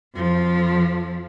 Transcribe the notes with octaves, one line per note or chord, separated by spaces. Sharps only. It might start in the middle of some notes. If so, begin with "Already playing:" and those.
F2 F3